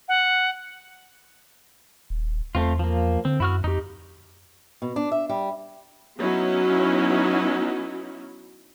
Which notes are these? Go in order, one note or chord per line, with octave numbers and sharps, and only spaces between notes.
F#5
D#1
E2 A3 C4 F4
F3 A#3
D3 C4
F#2 E4 F#4 F6
F2 D#4 G4
B2
D4
E5
G3
F#3 B3 C#4 D#4 E4 F#4